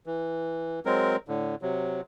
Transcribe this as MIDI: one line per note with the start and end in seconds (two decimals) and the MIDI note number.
0.06 0.80 52
0.85 1.16 54
0.85 1.16 56
0.85 1.16 60
0.85 1.16 70
1.28 1.55 45
1.28 1.55 50
1.62 2.01 48
1.62 2.01 54